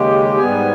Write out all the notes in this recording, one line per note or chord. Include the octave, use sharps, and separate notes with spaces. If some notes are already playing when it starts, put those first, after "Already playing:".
Already playing: D#2 C#3 G#3 G4 G5
G#2 G3 B3 G#4 G#5